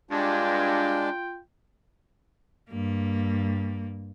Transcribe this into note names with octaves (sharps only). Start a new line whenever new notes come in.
G2 G#3 D4 F4 G5
G2 A#3